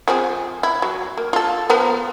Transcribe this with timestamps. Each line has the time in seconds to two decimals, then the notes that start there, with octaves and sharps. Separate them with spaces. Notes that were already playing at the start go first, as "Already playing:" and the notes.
0.08 F3 C4 G#4
0.63 E4
0.82 F#3
1.17 A#3
1.33 F4 A4
1.70 F3 B3 A#4